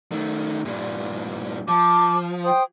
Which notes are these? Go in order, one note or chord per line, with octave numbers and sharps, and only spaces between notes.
D#3 A3
G2 A#2
F3 A5 D6
C5 G5 D#6